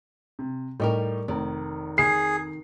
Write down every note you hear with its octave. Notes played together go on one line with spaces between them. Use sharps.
C3
A2 G3 D#4 G4 A#4 C#6
F1 D#3
G#4 C7